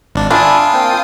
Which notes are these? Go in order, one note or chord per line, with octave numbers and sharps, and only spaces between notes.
G#1 D4
D4 F4 E5 G#5 B5 D#6
A#3 C4 G5